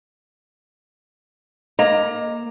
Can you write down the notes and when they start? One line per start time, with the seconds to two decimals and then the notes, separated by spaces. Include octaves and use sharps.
1.79 A#3 D#5 A#5